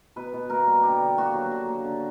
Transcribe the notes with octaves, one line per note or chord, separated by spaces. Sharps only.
B2 B4
B2
A#3 A#4
G3
D3 G4
D3
A#3 F#4
F#3
D3
A#3
D3